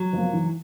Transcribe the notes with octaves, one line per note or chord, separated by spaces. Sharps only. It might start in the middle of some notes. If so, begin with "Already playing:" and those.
Already playing: F#3
F3 A#3
E3